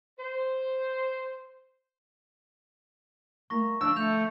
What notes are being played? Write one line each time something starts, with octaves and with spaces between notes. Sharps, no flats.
C5
G3 A3 A#3 C#6 A#6
D3 F3 D4 E6
A3 G6 F7